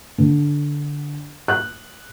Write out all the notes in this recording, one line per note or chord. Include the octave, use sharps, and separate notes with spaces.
D3
F#6